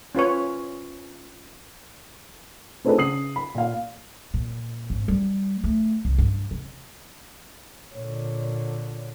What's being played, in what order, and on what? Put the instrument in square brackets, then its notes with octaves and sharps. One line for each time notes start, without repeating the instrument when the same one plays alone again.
[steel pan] C#4 F4 B4 C#5
[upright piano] A3 C4 D4 D#4 G#4 B4
C#3 D#6 C7 F#7
B5
A#2 F5
[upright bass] A#2
G#1
G3
A3
C2
G2
C2
[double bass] A#2 D3 [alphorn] C#5